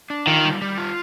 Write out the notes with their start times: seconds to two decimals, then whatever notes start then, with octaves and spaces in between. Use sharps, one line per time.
0.10 D4
0.27 D#3 F4
0.45 G3
0.62 G3
0.78 F4